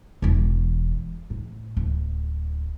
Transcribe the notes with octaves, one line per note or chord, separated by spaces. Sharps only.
E1 E3
A2
D1